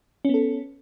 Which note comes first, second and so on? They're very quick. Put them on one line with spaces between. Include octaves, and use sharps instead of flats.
C#4 B3 A4